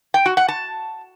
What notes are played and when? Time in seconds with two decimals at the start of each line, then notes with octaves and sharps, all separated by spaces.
0.14 G5
0.26 F#4
0.37 F#5
0.48 A5